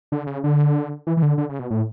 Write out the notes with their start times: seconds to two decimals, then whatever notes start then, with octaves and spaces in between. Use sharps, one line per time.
0.12 D3
0.27 C#3
0.44 D3
1.07 E3
1.17 E3
1.23 D3
1.38 D3
1.49 C#3
1.59 B2
1.71 A2